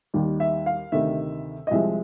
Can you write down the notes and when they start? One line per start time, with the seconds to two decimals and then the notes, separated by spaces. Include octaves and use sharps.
0.14 D#2 D#3 G3
0.40 E5
0.66 F5
0.92 D2 C3 D#3 E5
1.67 D#5
1.71 C2 C3 F3 G#3 E5